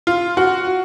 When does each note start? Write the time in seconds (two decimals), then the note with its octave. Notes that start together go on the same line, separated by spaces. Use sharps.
0.07 F4
0.37 F#4